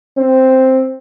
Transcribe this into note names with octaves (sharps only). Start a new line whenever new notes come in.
C4